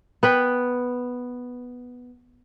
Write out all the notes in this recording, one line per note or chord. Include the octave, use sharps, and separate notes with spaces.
B3 B4 G5